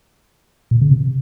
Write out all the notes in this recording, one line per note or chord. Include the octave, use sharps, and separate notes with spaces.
A#2
C#3
C3